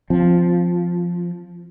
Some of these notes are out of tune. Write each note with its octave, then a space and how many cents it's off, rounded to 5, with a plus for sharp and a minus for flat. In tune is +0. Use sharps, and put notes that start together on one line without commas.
F3 +0 C4 +0